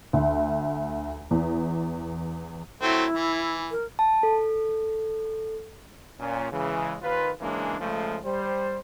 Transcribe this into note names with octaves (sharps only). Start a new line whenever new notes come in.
D2
E2
F#3 A3 C4 E4
E3
A#4
A5
A4
A#2 C#4
C#3 E3 G#3
D#2 F4 B4
C#3 E3 G#3 A#3 C#4 D4
C#3 F3 G#3 A3
G3 C5